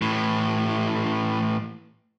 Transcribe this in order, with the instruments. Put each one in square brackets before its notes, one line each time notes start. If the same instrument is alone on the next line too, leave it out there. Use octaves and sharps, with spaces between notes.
[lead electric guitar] A2 E3